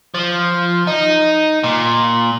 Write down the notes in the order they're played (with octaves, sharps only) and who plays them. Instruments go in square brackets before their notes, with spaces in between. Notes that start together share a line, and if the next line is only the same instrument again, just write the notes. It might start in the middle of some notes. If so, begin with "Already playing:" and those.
[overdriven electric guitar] F3
D#4
A#2